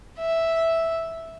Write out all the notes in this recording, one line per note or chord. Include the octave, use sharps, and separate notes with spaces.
E5